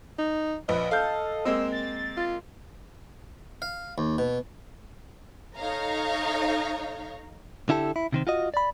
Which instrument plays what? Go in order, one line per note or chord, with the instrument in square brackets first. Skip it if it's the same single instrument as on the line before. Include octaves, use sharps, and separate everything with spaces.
[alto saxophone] D#4
[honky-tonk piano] A#1 [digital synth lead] B4 [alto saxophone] D#5
[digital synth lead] A4 [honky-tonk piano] F5 G6
[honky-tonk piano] G#3 A#3 C4 [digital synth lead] E6
[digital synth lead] A6
[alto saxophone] F4
[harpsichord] F5
D#2
B2
[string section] D#4 A4 C#5 F5 A#5
[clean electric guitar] D3 E4 G4 A4
E4
C3 D#3 C4
F4 F#4 D#5
D5 B5